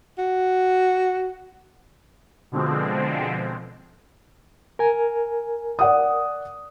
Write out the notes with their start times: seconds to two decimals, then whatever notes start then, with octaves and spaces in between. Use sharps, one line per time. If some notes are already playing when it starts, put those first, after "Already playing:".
0.18 F#4
2.52 B2 D3 F3 G#3 C4
4.79 A#4 G#5
5.79 D5 F#5 D#6